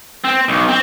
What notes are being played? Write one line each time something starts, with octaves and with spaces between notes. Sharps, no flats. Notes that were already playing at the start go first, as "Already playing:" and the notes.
C4
B1
C4